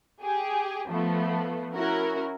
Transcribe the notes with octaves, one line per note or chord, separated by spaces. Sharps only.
G4 G#4
F3 A3 B3
C#4 E4 F#4 A#4